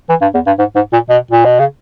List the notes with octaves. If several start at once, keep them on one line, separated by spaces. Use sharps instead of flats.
E3
G2
E2
G2
G#2
G#2
A#2
B2
A#2
B2
C#3